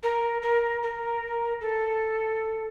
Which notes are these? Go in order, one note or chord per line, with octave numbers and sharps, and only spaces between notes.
A#4
A#4
A#4
A4